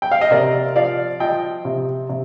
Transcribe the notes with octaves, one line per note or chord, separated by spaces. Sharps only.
G5
F5
D#5
C3 A#4 D5
F3 D5 F5
F3 D#5 G5
C3
C3